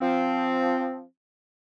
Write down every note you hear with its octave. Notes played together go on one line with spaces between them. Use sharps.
F3 C4